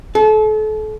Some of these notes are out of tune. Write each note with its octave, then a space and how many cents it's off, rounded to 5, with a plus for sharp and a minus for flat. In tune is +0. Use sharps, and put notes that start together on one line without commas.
A4 -35